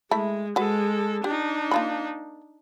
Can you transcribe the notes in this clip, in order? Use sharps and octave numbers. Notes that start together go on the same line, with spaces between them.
G#3 A3 E4 B5
G#3 F#4 A4 B4
D4 D#4 G4
A#3 F4 B5